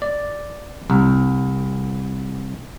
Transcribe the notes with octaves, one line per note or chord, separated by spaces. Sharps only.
D5
C2